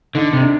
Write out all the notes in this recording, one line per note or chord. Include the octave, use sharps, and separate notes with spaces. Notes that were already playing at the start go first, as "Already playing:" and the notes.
D3 D#4
C3
D4